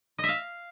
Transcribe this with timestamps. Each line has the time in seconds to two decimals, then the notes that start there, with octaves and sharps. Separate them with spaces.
0.18 D#5
0.23 E5
0.28 F5